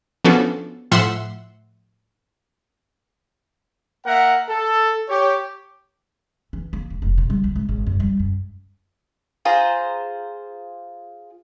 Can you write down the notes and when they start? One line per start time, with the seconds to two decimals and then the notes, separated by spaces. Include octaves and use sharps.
0.25 F3 B3 C#4 D4 F#4 A4
0.91 A2 F3 E5 F#5 C6 E6
4.05 A#3 A#4 E5 F#5
4.49 A4
5.09 G4 C#5
6.53 E3
6.73 A#3
6.90 D1
7.02 F1
7.18 C3
7.30 G3
7.44 D2
7.56 G#1
7.69 G#1
7.87 F#2
8.00 G3
8.20 F#2
9.45 F4 G#4 C5 A#5